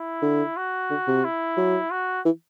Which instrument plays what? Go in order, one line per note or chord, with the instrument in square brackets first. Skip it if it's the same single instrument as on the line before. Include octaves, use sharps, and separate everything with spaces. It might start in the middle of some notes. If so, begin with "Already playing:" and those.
Already playing: [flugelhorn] E4
[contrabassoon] D3
[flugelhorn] F#4
[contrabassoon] D3
C3
[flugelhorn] E4
[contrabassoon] F#3
[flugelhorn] F#4
[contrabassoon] E3